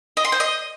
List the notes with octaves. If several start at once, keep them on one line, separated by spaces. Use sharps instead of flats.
D#5
C6
C5
D#5